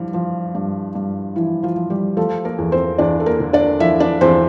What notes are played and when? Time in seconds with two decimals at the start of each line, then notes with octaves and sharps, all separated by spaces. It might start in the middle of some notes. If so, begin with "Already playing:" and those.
Already playing: G2 E3 F3
0.14 F3
0.55 G2
0.95 G2
1.36 E3 F3 E4
1.63 F3 F4
1.76 F3
1.90 G3 G4
2.17 F3 A3 A4
2.45 A#3 A#4
2.58 E2
2.72 C4 C5
2.98 E2 D4 D5
3.20 A4
3.26 A#3 A#4
3.40 D3
3.53 D4 D5
3.80 F3 E4 E5
4.00 D4 D5
4.21 E2 C4 C5